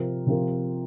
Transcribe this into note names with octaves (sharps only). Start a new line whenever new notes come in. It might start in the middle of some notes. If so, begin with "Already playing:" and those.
Already playing: C3 F3 C4 F4 A#4
C3 F3 C4 F4 A#4